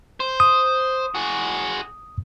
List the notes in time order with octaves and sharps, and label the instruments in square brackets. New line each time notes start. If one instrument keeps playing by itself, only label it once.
[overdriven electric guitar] C5
[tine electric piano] D#6
[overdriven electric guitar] F#4 G#4